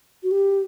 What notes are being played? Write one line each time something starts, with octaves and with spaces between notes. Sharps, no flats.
F#4
G4